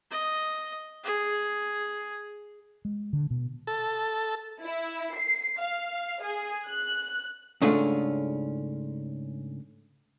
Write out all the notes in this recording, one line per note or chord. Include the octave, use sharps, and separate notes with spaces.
D#5
G#4
G#3
D3
B2
A4
E4
C7
F5
G#4
F#6
G#2 C#3 A3 C#4 D4 F4